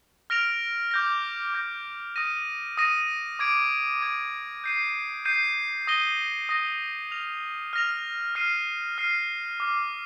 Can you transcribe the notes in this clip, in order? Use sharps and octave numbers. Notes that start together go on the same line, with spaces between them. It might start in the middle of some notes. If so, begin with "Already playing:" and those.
F6 A#6 D7 F7
D6 G6 A#6
D6 G6 A#6
D#6 A#6 D#7
D#6 A#6 D#7
D6 G#6 D7
D6 G#6 D7
G6 C7 D#7
G6 C7 D#7
D#6 A#6 D#7 G7
D#6 A#6 D#7 G7
F6 A#6 F7
F6 A#6 F7
F6 C7 D#7
F6 C7 D#7
D6 F6 C7